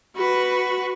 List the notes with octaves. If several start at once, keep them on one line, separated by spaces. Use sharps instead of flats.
F#4 B4